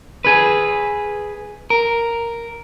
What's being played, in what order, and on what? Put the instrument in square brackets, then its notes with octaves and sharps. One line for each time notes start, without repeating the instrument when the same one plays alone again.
[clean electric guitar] G#4 B4
A#4